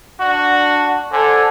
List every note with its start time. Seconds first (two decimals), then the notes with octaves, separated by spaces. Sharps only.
0.20 D4 F#4
1.12 D3 A4 C5 G#5